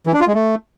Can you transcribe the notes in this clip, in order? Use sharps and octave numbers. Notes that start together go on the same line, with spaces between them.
E3
D4
F4
G#3
A3